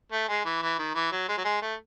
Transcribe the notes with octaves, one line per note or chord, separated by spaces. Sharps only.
A3
G#3
E3
E3
D#3
E3
F#3
G#3
F#3
G#3
A3